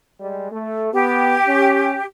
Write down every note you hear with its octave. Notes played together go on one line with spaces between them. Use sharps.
G3 G#3
A3
B3 G4
C#4